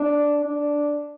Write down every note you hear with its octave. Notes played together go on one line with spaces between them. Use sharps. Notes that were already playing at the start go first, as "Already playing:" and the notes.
Already playing: D4
D4